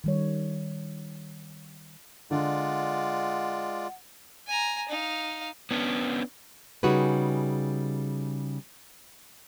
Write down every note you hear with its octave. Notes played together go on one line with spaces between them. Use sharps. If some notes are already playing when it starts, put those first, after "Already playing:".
D#3 G3 C#5
D3 G#3 F4 D5 F#5
G#5 A#5
D#4 F5
B3 C#4 D4
C#3 G3 D#4 F#4 G#4 B4